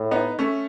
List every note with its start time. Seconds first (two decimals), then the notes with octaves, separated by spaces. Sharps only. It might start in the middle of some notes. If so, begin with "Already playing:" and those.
Already playing: A2
0.11 B3 D#4
0.39 A3 C#4